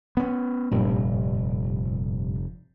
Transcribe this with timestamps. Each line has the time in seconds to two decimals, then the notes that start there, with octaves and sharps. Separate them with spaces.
0.17 B3 C#4
0.71 F1 G2 A#2 G3